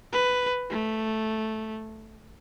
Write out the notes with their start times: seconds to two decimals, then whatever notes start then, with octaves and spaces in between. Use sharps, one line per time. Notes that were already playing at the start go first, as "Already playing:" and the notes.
0.13 B4
0.70 A3